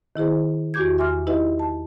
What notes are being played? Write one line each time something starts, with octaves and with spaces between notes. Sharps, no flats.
D#3 E4 G#4 C5
E2 F#4 G4 D6 G6 G#6
E5 G#5 C6 D6 F6
D#4 E4 G4 B4 D#5 E5
A5